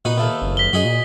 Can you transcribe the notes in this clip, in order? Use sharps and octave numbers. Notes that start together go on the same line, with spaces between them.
A#2 B3 D#4 F#4
D#2 A3 B3
F#1
B6 G7
F#2 F#4 G#4 D#5
A#2